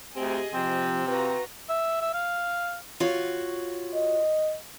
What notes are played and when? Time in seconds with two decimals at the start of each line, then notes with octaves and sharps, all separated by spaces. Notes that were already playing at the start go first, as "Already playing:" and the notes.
0.16 D2 C4 G4 G#4 D#5
0.53 C3 F3 C4
1.08 C4 F4 F#4 B4 A#5
1.69 E5
2.01 E5
2.14 F5
3.00 F4 F#4 C#5
3.94 D#5